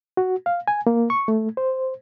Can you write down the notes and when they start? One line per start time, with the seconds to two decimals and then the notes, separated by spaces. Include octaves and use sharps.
0.17 F#4
0.46 F5
0.68 G#5
0.87 A#3
1.10 C#6
1.28 A3
1.57 C5